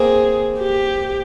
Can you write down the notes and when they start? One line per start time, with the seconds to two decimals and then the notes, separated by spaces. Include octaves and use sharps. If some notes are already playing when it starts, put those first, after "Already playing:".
Already playing: A#3 C4 G#4
0.60 G4